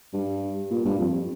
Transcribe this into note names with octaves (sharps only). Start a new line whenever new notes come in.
G2
A#2
G2
F2